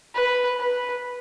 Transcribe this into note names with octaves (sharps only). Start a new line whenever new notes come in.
B4
B4